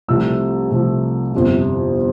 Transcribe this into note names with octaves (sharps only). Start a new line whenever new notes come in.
C2 C3 F3 A3 E6
C2 C3 F3 A3
G1 F2 C3